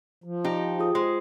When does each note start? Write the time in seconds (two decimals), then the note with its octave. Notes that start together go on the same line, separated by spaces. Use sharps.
0.24 F3
0.44 D#4 G4
0.79 F4 G#4 D#6
0.95 G#3 C5